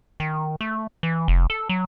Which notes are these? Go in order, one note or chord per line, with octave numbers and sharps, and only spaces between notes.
D#3
A3
E3
F1
A4
F#3